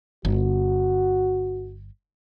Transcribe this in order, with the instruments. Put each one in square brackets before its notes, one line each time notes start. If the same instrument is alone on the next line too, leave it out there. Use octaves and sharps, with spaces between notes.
[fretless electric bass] G1 [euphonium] F#4